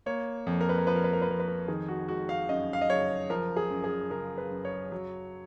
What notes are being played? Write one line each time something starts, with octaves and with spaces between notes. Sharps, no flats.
A#3 C#5
F2
A#4
B4
A#4
F3 B4
A#4
B4
A#4
B4
F2 A#4
B4
A#4
D#3 G#4
F#4
G#3 F#4
F5
F#2 D#5
F5
D#5
F#1 C#5
F3 A#4
G#4
F#2
G#4
C#3 A#4
B4
F#2
C#5
F#3